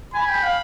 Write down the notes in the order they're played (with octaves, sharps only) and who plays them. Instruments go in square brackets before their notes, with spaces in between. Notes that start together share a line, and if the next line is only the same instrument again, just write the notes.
[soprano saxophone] G#5 [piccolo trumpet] B5
[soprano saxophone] G5
F5